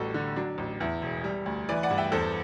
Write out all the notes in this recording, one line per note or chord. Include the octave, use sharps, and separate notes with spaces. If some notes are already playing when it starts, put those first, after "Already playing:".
Already playing: A1 G3 F#4 A4
D3
F#3 D4
A1
E2 E4
E1
G3
D2
E3 B4 D5
D5 F#5
G2
E5 G5
E2 A4 C5